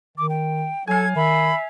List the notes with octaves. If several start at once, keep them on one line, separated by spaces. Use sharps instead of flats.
D#3 D6
G5
F#3 A4 F5 G#5 G#6
D#3 E5 B5